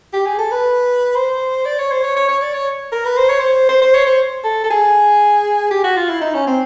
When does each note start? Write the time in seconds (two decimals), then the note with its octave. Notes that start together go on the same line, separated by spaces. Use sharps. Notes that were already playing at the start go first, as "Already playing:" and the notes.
0.13 G4
0.26 G#4
0.38 A4
0.52 B4
1.15 C5
1.66 D5
1.79 C#5
1.92 C5
2.04 C#5
2.16 C#5
2.28 C#5
2.42 D5
2.54 C#5
2.92 A#4
3.05 B4
3.17 C5
3.29 C#5
3.40 C5
3.69 C5
3.81 C5
3.94 C#5
4.06 C5
4.44 A4
4.64 A4
4.70 G#4
5.71 G4
5.84 F#4
5.97 F4
6.09 E4
6.21 D#4
6.34 C#4
6.47 C4